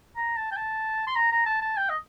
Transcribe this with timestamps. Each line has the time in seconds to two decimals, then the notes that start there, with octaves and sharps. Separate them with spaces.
0.16 A#5
0.36 A5
0.51 G5
0.56 A5
1.07 C6
1.15 A#5
1.32 A#5
1.46 A5
1.61 A5
1.77 G5
1.89 D#5